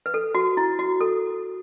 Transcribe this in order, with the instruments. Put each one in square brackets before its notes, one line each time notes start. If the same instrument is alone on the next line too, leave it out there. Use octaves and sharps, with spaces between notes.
[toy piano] B4
A4
F#4
E4
F#4
A4